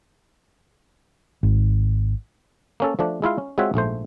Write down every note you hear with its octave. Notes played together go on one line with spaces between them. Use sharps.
G#1
A#3 C#4 A4
F3 A3 D4
G#3 E4 F4 F5
C#4
G#3 C4 F4 F#4 C#5 E5
A#1 G#2 A3 C5